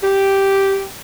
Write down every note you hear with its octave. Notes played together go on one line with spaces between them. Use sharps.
G4